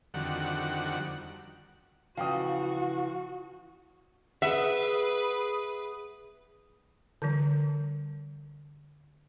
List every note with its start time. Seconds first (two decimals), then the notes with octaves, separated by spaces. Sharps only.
0.14 F2 D3 D#3 G3 F#4 F#5
2.17 C#3 E3 F3 F#4 F5 G5 D#6
4.42 G#4 B4 E5 F#5
7.22 D3 E3 G3